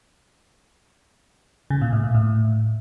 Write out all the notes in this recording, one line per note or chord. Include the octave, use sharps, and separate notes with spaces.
C#3
A#2
A2
A#2
A2